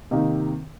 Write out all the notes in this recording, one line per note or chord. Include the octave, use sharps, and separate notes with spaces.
C3 D#3 A#3 D#4